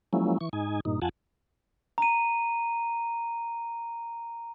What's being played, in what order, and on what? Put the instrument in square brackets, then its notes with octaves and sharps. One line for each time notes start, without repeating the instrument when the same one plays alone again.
[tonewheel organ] F3 F#3 G#3 A#3 C#4 E4
E3 C#6
G#2 D#4 G#5
G2 A#2 D#4
F2 F4 F#5 G#5 A5
[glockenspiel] A#5 D#7